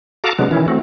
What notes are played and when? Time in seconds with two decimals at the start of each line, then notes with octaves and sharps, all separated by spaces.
0.24 F#4 A4 F5 A5 A#5 D6
0.39 C3 F#3 G#3 B3 D4
0.51 D#3 E3 C#4 E4
0.68 A3 C4 F#4